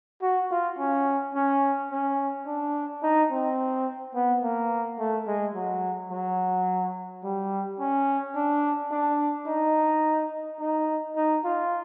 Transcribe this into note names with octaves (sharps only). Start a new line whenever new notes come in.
F#4
F4
C#4
C#4
C#4
D4
D#4
C4
B3
A#3
A3
G#3
F#3
F#3
G3
C#4
D4
D4
D#4
D#4
D#4
F4